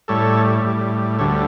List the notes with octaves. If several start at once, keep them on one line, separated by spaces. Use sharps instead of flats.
A2 G3 A4 C#5
A2 G3
D2 D3 G3 A4 C#5